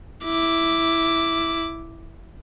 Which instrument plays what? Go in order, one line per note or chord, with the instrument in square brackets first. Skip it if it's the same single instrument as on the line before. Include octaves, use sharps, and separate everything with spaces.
[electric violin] E4 D6